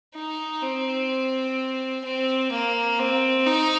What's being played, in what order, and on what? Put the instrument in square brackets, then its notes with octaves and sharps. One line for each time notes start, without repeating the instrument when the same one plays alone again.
[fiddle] D#4
C4
C4
A#3
C4
D#4